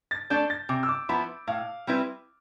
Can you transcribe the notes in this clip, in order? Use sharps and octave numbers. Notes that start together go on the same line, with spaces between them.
A6
A3 D4 A4 D5 G6
A6
C3 D6
E6
D6
F3 B3 E4 B5
A2 F5
G3 C4 E4 B4